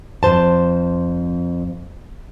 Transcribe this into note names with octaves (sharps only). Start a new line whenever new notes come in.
F2 G#2 C5 A5